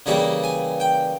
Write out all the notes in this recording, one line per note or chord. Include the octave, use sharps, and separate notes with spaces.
C#3 E3 G3 A#3 A#5
G#5
G5